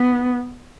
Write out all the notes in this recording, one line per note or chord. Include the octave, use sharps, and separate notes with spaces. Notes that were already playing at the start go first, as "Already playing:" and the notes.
Already playing: B3